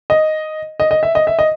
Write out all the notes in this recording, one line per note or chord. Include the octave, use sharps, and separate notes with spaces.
D#5
D#5
D#5
E5
D#5
E5
D#5